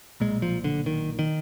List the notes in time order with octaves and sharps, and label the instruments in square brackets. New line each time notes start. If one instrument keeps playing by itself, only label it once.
[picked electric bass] B1 A#2 G#3
F3
D3
D#3
D#3